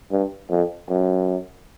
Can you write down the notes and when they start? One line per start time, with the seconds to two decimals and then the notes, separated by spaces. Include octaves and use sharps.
0.12 G2
0.50 F2
0.89 F#2